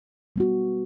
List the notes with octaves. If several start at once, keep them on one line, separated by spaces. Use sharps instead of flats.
G3 B3 F#4